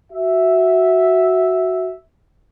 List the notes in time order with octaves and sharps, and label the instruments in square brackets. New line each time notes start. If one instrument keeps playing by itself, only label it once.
[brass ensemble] F#4 E5